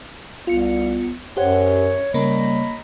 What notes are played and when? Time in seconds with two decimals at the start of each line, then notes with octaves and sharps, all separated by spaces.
0.47 C2 B3 F4 C#7
1.37 F#2 G4 C5 C#5 F#5
2.14 C#3 G3 A#3 C#5 D#5 A#5 B5